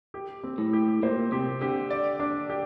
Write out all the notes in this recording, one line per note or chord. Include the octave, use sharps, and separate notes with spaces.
G4
C4
A2
G4
A#2 C5
C3 G4
D3 G4
D5
D4
G4